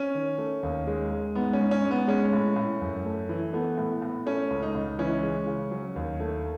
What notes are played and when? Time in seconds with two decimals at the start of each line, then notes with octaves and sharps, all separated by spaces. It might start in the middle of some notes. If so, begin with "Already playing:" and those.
Already playing: C#4
0.15 D#3
0.38 A3
0.63 D#2
0.87 G#3
1.11 G#3
1.35 G#2 B3
1.53 C#4
1.59 G#2
1.71 C#4
1.84 G#2
1.91 B3
2.08 G#3 C#4
2.33 A2
2.56 A2
2.82 F#2
3.06 A3
3.29 E3
3.53 A3 B3
3.78 A2
4.02 A2
4.26 A3 C#4
4.50 C#2
4.63 D#4
4.75 C#2
4.99 E3 C#4
5.23 G#3
5.47 C#3
5.71 F#3
5.96 D#2
6.20 A3